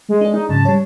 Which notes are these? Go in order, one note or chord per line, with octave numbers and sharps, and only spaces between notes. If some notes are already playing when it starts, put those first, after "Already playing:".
G#3
D4 G#4
D#4
G#2 C#3 F#3 A5
G3 C#5